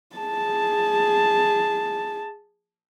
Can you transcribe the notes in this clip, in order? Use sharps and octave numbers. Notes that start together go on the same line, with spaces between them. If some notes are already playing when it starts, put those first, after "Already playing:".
G#4 A5